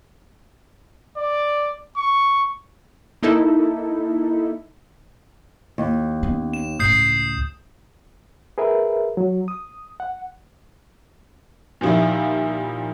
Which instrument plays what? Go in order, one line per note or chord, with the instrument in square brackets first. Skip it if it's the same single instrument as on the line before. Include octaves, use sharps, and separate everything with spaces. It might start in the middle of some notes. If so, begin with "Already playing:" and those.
[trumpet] D5
C#6
[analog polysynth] A#3 D#4 E4 A4
[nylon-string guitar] D#2
[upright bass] B3 C#4
[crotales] E7
[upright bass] C#2 A2 [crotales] D#6 G6 C7
[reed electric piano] G#4 A#4 B4 E5
F#3
D#6
F#5
[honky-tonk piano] A#2 D#3 F3 G3 E4